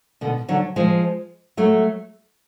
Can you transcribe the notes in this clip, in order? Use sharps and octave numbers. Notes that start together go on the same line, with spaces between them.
B2 D3
D3 F#3
F3 G#3
F#3 A3